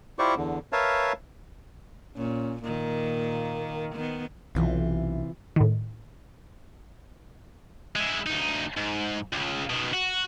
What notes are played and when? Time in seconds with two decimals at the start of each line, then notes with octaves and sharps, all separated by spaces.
0.19 E4 F4 G4 C5 D5 C#6
0.36 E2 D3
0.73 A#4 B4 C#5 E5 F5 A5
2.16 A#2 C#4
2.63 A#2 D#3 A#3
3.95 D#3 B3
4.55 B1 C3 E3 F4
5.56 A2 D#3
7.96 G#3 E4
8.27 D2 D#4
8.77 G#2
9.33 C#2 C#3
9.70 B2 D#3
9.93 F#4